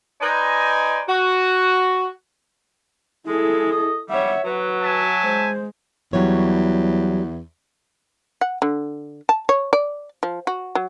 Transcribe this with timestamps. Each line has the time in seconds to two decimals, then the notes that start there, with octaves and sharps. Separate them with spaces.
0.21 D#4 B4 C5 D5 D#5 G#5
1.09 F#4
3.27 G#3 E4 G#4 A4
3.71 D#5
4.10 G3 C#5 E5 F#5
4.45 F#3 F#4 B4
4.83 E5 G#5 A5
5.23 G#3 C5
6.13 E2 F#3 G3 C#5
8.41 F#5
8.62 D3
9.29 A5
9.49 C#5
9.73 D5
10.23 F3
10.47 F#4
10.75 F#3